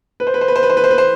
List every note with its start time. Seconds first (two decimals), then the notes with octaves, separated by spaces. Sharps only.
0.20 B4
0.27 C5
0.34 B4
0.41 C5
0.48 B4
0.56 C5
0.63 B4
0.70 C5
0.77 B4
0.84 C5
0.91 B4
0.98 C5